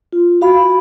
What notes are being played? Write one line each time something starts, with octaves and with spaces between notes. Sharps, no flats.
F4
F#4 F5 B5